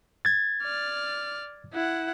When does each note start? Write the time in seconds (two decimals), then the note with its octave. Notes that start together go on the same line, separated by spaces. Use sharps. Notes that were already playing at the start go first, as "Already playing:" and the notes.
0.25 G#6 A6
0.63 D5 F6
1.74 E4 F#5